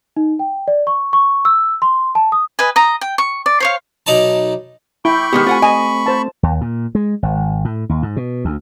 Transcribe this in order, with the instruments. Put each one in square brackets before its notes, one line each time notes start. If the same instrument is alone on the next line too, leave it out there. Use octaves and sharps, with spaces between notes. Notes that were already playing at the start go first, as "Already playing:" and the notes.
[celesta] D#4
G5
D5
C#6
C#6
E6
C6
A5
D#6
[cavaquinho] B4 D#5 G#5
D#5 A#5
G5
C#6
D5
C5 C#5 F5
[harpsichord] B1 D#4 D5 A5
[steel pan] E4 [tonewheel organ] G5 D6 G6 [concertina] B5 C#6
[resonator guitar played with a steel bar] D#3 G#3 B3 [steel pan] G4
[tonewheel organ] A3 C4 [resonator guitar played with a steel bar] F4 F#5 G#5
[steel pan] D#5 [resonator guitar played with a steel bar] G#5
[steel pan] C5 A5
[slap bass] D#2
A#2
G#3
G#1
A2
D#2
G#2
B2
D2